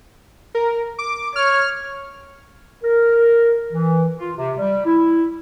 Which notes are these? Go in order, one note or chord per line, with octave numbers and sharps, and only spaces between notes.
A#4
D6
C#5 F6
A#4
E3
F4
C3
G3
E4